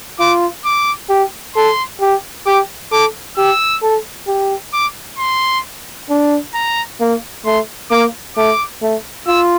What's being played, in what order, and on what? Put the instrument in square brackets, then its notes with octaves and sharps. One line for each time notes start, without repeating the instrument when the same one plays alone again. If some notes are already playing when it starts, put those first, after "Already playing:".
[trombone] F4 [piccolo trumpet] D6
[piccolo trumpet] D6
[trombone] G4
[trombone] A4 [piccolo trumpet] C6
[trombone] G4
[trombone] G4 [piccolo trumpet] D6
[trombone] A4 [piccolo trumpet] D6
[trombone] G4 [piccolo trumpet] E6
[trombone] A4
G4
[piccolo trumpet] D6
C6
[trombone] D4
[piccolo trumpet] A#5
[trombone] A#3
[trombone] A3 [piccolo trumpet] C6
[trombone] A#3 [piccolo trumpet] D6
[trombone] A3 [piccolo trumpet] D6
[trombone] A3
[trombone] F4 [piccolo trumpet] E6